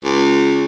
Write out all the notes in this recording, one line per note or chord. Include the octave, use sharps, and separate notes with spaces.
C#2